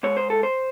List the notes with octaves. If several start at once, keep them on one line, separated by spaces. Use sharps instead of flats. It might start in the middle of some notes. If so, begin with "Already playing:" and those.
G#2 C#5
C5
A4
C5